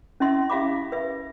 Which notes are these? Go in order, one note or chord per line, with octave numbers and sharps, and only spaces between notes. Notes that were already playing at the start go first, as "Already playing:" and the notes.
C#4 E4 D#5 E5 C6
E4 G4 E5 F5 B5 D6
B4 E5